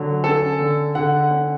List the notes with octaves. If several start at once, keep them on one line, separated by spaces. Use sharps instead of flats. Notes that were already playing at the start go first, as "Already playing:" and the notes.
Already playing: D3 F#3
C#4 A4
D3
D3 F#5
C#4